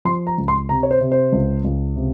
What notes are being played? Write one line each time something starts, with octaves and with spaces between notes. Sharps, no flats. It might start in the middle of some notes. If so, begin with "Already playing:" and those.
F3 C6
A#5
C#2
C6
C3 A#5
C#5
C5
C3
C5
C#2
C#2
C3